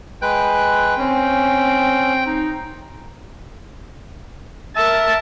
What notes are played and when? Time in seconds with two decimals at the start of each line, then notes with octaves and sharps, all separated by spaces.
0.22 G#3 B4 G5 F#6
0.98 C4 C#4
2.26 D#4
4.76 A#4 E5 A5